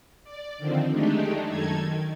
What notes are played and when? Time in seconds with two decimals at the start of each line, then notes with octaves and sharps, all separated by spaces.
0.24 D5
0.58 D3 D#3 F3 C4
0.90 G#3 A3 D4 D#4 G4
1.47 F#2 D#3 D#4 A4 G#6
1.82 D#3